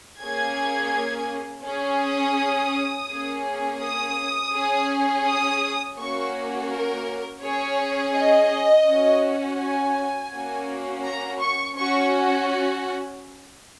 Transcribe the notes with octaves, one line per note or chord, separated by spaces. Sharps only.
A#3 C#4 G#4 G#6
C#4 G#4
D#6
A#3 C#4 G#4
D#6
C#4 G#4
D#6
A#3 C#4 F#4 C#6
A#4
C#4 G#4 C#5
D#5
C#4 F#4
G#5
A#3 C#4 F#4
A#5
C#6
C#4 F#4 C#6